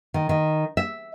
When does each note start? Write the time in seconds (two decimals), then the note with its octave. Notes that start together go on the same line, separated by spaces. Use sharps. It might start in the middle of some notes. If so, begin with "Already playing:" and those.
0.14 D#3
0.29 D#3
0.77 E5